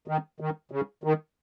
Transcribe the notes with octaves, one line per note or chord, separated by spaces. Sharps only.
D#3
D#3
C#3
D#3